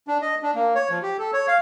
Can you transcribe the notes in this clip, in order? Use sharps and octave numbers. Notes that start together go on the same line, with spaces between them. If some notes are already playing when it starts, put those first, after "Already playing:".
D4
D#5
D4
A#3
C#5
F3
G4
A4
C#5
F5